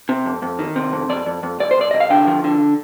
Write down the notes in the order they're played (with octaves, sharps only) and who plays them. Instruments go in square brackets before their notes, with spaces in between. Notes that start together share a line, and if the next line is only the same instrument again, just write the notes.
[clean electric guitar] C3
F2
F2
D#3
C3
F2
F2 D5
F2
F2
C2 D5
C5
C2 D5
C2 D#5
F5
D3 G5
F3
D3